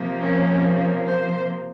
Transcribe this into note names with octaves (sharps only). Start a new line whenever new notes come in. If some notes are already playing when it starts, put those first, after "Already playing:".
Already playing: C3 F3 A#3
C#4
C5